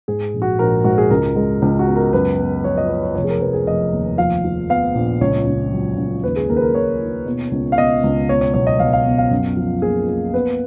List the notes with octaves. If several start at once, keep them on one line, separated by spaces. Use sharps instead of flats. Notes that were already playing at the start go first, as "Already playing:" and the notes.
G#2 G#4
A#1
F#4
A#1 A#4
G#2 F#4
G#4
C#2 A#4
G#3
C#2
F#4
B3
A#4
F#2 B4
B3
F3 C#5
D#5
B3 C#5
C#5
F1 C#5
G#4
A#4
F1 B4
G#4
F1 D#5
D#2
F3 F5
F3
B3 F5
A#1
C#2 C#5
C#2
F#3
C#2
D#2 B4
G#4
D#2 A#4
B4
A#4
D#2 C#5
D#3
B2
C#2
F5
B2 D#5
C#2
B2 C#5
C#5
B1 C#5
D#5
B1 F5
F5
B2
F5
F#2
F3
A#3 G#4
A#3
B3 B4